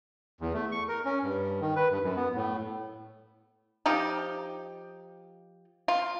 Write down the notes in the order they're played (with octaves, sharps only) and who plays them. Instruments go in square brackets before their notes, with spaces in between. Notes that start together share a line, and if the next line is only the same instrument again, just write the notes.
[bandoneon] E2
A3
C#6
A#4
C#4
G2
D#3
B4
G2
F#2
B3
A2
[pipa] F3 D#4 G4
F4